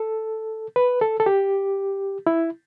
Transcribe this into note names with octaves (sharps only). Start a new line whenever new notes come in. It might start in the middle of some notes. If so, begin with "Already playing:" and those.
Already playing: A4
B4
A4
A4
G4
E4